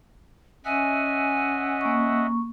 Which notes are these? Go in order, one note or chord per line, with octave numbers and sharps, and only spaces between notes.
C#4 D#5 E5 F#5 G#5
A#3 C#6